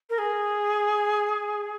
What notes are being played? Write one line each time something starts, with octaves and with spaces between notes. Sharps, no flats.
A#4
G#4